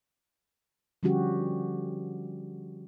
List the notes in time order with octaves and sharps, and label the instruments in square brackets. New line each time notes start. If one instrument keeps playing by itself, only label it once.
[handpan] D3 F3 G3 C#4 F#4 G4